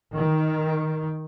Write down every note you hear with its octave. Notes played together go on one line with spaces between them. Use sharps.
D#3